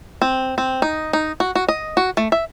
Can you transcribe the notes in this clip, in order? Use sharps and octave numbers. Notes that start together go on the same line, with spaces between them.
C4
C4
D#4
D#4
F#4
F#4
D#5
F#4
A3
E5